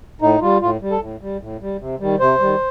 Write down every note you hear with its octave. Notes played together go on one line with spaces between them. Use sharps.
A2 D#4
G3 F4
A2 F4
G3
A4
A2
G3
A2
G3
C3
D#3 G3
C3 C5
D#3 G3